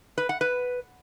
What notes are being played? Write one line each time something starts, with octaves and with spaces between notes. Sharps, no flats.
B4
F#5
B4